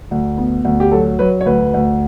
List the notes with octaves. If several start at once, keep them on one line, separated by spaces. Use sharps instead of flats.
D2
B3
D2
G4
F#3 A4
F#3 B4
C#5
D2 B4
D2